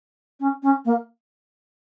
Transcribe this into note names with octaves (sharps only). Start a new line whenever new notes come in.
C#4
C#4
A#3